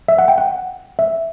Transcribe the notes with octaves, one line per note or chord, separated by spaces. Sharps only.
E5
F#5
G5
F#5
E5